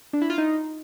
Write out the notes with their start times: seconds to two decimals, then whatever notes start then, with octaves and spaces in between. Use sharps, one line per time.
0.13 D4
0.22 E4
0.30 F4
0.38 D#4